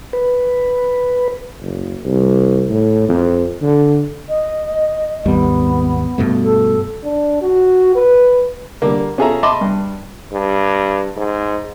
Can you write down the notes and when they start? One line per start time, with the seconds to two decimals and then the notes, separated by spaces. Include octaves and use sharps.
0.13 B4
1.61 F#1
2.05 C2
2.70 A2
3.09 F2
3.62 D3
4.29 D#5
5.26 G#1 D#2 G3 B3
6.18 G2 B2 A3
6.44 A4
7.04 D4
7.42 F#4
7.95 B4
8.82 D3 G3 A#3
9.18 C#4 F4 G#4 A4 E5 A#5
9.43 D#5 E5 A5 B5 C6 D6
9.61 G2
10.32 G2
11.17 G#2